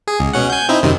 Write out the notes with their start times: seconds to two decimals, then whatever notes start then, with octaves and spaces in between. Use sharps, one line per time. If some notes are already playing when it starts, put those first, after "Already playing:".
0.07 G#4
0.19 C#2
0.34 B2 C#4 F#5
0.50 G#5 G6
0.69 C4 D#4 E4
0.83 F#2 C3 D#3